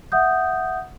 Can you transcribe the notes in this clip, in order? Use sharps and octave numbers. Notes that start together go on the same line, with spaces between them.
E5 F#5 D#6 G6